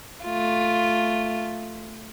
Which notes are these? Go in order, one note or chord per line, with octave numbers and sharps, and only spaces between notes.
A3 F4